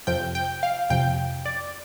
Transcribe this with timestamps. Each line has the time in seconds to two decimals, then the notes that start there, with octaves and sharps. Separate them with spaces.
0.07 F2 C3 F3 G5
0.35 G5
0.63 F5
0.90 F2 C3 F3 G5
1.46 D5